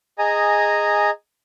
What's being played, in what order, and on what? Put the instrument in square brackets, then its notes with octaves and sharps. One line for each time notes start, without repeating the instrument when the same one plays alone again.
[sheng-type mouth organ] G#4 D#5 G#5 A#5